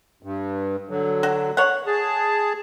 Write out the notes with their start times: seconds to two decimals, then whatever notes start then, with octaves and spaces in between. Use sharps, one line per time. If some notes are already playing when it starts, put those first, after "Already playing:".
0.23 G2
0.89 D3 F#3
1.23 F#4
1.57 C#5 F#5
1.87 G#4 A5